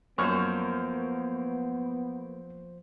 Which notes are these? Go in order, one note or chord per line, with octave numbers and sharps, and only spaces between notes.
F#2 F3 A#3 B3 C5 C#6 F6